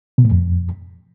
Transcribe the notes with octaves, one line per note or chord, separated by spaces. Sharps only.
B2
A2
F2